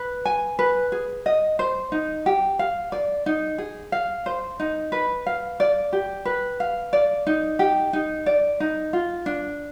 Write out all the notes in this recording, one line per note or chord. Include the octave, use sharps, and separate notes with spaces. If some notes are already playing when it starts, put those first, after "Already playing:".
Already playing: B4
G#5
B4
G#4
D#5
C5
D#4
G4
F5
D5
D#4
G#4
F5
C5
D#4
B4
F5
D5
G4
B4
F5
D5
D#4
G4
D#4
D5
D#4
F4
D4